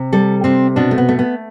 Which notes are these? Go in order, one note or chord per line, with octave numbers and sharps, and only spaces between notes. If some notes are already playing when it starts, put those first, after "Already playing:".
Already playing: C3
G3 A4
C3 C4
B2 D4
A3
B3
A3
B3